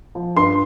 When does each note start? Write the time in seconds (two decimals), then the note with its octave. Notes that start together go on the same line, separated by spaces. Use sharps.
0.15 F3
0.36 G2 C6